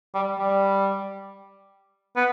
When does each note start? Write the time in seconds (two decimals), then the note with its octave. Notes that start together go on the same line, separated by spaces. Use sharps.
0.14 G3
0.39 G3
2.16 B3